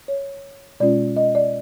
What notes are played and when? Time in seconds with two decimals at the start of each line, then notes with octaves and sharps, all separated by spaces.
0.08 C#5
0.80 B2 G#3 C#4 F4 D5
1.17 D#5
1.35 D5